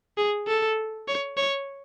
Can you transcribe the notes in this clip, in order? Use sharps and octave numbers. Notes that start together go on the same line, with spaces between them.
G#4
A4
C#5
C#5